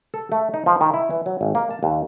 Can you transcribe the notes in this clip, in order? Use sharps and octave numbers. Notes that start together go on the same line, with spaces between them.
A4
A3
D#4
F3
D#3
E4
E3
F#3
G#1
A#3
A5
D#2